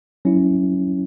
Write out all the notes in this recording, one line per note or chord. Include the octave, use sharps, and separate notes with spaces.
F#3 C#4 E4